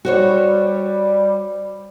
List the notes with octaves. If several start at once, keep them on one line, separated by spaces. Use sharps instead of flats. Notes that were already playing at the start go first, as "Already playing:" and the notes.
G3 F#4 C5 C#5